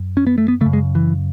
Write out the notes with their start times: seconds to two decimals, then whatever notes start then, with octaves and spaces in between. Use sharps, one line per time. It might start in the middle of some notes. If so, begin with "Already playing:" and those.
Already playing: F#2
0.17 C#4
0.27 B3
0.38 A3
0.48 B3
0.61 C#3 A3
0.66 F#2
0.73 G#3
0.95 E3